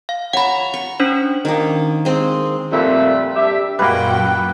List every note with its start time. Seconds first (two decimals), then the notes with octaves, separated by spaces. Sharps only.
0.09 F5
0.33 C#5 F#5 A#5 B5
0.74 C#6
1.00 C#4 D4 C5
1.45 D#3 A#3
2.05 G#3 C4
2.72 F2 A#2 G3 A3 E5
3.36 G2 D4 G4 E5
3.79 F#2 A#2 G3 G#3 A#3 F#4 B4 G5